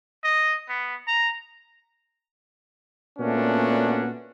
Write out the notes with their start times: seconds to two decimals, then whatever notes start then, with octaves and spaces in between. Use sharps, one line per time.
0.24 D#5
0.69 B3
1.07 A#5
3.19 A#2 A3 B3 C#4 D4 F#4